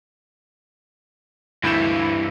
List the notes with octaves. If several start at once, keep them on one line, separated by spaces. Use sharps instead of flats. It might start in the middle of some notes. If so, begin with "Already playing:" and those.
D2 G2 E3 E4 G6 E7